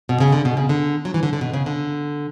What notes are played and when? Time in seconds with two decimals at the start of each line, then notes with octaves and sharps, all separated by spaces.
0.09 B2
0.20 C#3
0.33 D3
0.45 B2
0.57 C#3
0.69 D3
1.05 F#3
1.14 E3
1.23 D3
1.33 D3
1.41 B2
1.54 C#3
1.66 D3